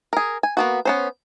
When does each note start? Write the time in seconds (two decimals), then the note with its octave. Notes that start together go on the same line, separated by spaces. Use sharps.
0.13 G#4 A#4
0.43 G#5
0.57 A#3 B3 F#4
0.85 B3 C#4 C5